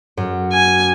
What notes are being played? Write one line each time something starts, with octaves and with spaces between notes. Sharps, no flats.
F#2
G#5